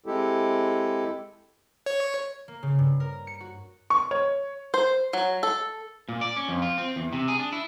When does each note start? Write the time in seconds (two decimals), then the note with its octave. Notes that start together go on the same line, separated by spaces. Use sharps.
0.06 G#3 C4 E4 G4 A4
1.86 C#5
2.48 A#3
2.63 C#3
2.79 G2
3.00 A#4
3.27 C#7
3.40 F#4
3.90 C#6
4.11 C#5
4.74 C5
5.13 F#3
5.43 A4
6.09 A#2
6.21 D5
6.37 C#4
6.49 F2
6.62 F4
6.78 C4
6.96 E2
7.13 C3
7.28 G#4
7.40 D4
7.53 E4